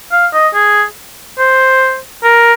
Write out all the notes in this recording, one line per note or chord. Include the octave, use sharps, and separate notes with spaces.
F5
D#5
G#4
C5
A#4